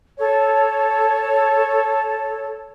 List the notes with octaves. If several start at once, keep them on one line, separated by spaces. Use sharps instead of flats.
A4 C#5